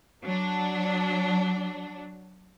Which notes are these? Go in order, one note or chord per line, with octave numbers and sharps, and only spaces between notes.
F#3 D4